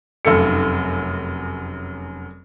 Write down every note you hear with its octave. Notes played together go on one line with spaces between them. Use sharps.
F1 F#2 A4 C#7